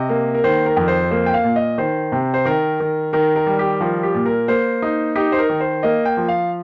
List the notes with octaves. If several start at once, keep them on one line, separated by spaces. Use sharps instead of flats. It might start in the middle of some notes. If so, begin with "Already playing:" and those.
Already playing: C3 D#5
A#3
A#4
D#3 C5
A#4
F2
C5
A#3 C5
G5
F5
A#2
D#5
D#3 C5
C3
C5
D#3 A#4
D#3
D#3 A#4
A#4
G3
G4
F3 A#4
G4
A#2
A#4
A#3 C5
D#4
D#4 G4
C5
A#4
D#3
C5
A#3 D#5
G5
F3
F5